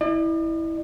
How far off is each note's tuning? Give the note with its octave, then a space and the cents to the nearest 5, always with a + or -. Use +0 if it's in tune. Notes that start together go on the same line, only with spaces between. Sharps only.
E4 -15 D5 +45